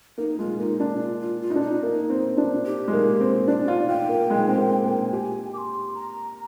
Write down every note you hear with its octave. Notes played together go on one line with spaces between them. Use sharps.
A#3 D#4
G#3 F4
A#3 D#4
D4 F4
F4
F4
F4
D#4
D4
D#4
A#3
C4
D4
G4
G#3
A#3
C4
D4 D5
F4
F4 G5
A#3
G#3
C4
A#3
A#3
G4 G#5
D6
C6
A#5